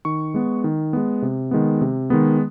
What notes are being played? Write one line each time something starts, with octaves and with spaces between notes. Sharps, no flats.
D#3 C#6
G#3 B3
D#3
G#3 B3
C3
D#3 G#3 B3
C3
D#3 G#3 B3